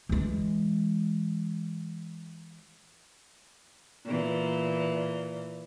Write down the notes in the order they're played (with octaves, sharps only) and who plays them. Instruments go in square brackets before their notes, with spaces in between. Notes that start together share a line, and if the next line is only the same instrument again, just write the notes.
[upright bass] E3 G#3
[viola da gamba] A#2 E3